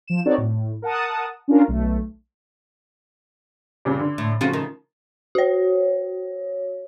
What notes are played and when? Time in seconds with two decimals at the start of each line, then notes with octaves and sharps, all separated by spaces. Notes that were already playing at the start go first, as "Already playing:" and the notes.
0.08 F3 E7
0.25 C4 D#4 F#4 A4 C#5 D5
0.38 A2
0.82 A#4 F#5 A5 D#6
1.48 C#4 D4 F4 A#4
1.68 B1 A3
3.85 G2 A#2 C#3
3.99 D3
4.18 A2
4.41 C#3 F3 A3 F4 F#4
4.53 D#3
5.35 F#4 C#5